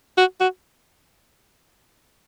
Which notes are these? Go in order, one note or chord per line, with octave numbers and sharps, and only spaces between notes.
F#4
F#4